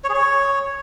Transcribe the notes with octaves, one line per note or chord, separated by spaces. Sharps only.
C#5
G#4
C#5